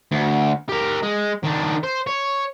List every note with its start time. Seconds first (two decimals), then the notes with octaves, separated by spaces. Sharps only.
0.11 D2
0.69 G4 A#4
1.03 G#3
1.43 D#3 D4
1.83 C5
2.07 C#5